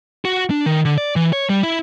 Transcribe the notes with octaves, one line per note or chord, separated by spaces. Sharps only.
F#4
D4
D#3
D3
D5
E3
C#5
G3
E4